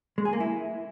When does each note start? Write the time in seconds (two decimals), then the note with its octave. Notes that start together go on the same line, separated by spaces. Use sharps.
0.18 G#3
0.25 G#4
0.33 A#3
0.40 E4